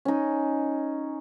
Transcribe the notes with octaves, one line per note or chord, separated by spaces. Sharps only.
C#4 D#4